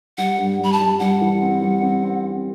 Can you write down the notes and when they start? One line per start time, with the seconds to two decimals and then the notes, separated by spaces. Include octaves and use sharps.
0.18 G3 F#5
0.38 G2
0.59 G3
0.64 B5
0.72 A5
0.80 G3
1.00 G3 F#5
1.21 E3
1.41 C4
1.62 G3
1.82 C4
2.03 C4
2.23 C4